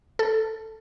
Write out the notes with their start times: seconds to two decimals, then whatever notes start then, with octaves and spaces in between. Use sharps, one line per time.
0.19 A4